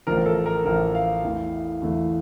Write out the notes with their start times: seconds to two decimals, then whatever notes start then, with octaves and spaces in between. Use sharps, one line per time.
0.07 A1 A2 F3 A#4
0.26 A4
0.46 A#4
0.65 A1 A2 F3 A#4
0.95 F5
1.23 E2 E3 A3
1.82 E2 E3 A3